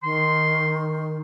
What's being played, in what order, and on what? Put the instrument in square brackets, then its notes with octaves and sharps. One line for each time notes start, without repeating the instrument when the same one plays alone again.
[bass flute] D#3 [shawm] C6